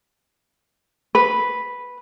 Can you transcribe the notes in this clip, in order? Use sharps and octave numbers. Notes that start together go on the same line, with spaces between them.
B4